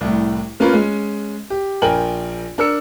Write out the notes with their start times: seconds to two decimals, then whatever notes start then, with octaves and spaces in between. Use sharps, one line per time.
0.01 C2 A2
0.60 A#3 C#4 F4 A#4 B4
0.73 G#3 C#4
1.50 G4
1.82 A#1 A#4 G5 G#5 F#7
2.58 D4 A#4 E6 C#7